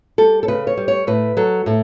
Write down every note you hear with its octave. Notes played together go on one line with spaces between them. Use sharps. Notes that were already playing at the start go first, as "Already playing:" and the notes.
G3 A4
A4
C#3 B4
C#5
G3
C#5
A2 B4
F#3 A4
A2 A4